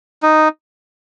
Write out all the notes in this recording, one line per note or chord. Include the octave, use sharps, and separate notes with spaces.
D#4